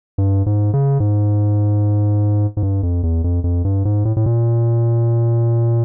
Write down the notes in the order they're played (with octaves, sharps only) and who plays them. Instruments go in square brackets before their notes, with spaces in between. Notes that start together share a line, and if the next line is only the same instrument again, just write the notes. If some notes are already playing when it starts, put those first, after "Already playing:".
[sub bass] G2
G#2
C#3
G#2
G#2
G2
F2
E2
F2
F2
G2
G#2
A2
A2
A#2